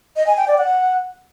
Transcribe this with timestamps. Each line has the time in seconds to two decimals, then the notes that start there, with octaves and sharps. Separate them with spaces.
0.16 D#5
0.27 G#5
0.37 G5
0.48 D5
0.58 F#5